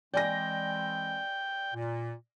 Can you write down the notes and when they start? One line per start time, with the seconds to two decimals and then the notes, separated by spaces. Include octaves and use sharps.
0.14 E3 G#3 C4 D5 G5 G#5 A#6
1.74 A#2